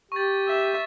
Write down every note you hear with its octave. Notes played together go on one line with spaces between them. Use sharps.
G4 C#6 A6
E5